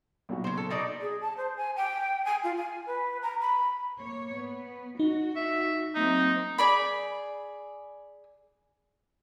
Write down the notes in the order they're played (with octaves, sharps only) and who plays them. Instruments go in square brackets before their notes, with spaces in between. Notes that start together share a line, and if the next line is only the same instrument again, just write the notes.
[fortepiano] B1 A#2 F#4
[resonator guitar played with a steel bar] C#3 C5
A4
B2 D#4 D5
[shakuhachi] G#4
A5
C5
G#5
G5
G#5
F4
G#5
B4
A#5
B5
[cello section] A#3 C#5
B3
[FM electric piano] D#4 [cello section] F#4
[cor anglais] E5
[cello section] F#3 A#3 C4 [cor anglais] D#4
[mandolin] G#4 D5 B5